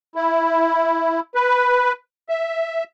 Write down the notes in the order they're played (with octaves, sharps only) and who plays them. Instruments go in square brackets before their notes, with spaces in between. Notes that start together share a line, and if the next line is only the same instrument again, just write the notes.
[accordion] E4
B4
E5